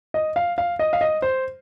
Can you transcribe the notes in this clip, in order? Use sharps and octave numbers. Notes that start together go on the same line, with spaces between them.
D#5
F5
F5
D#5
F5
D#5
C5